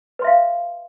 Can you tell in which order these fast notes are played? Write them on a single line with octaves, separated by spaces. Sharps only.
B4 C6 E5 F5